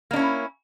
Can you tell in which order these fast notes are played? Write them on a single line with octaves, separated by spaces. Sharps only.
A#3 D4 C#4 E4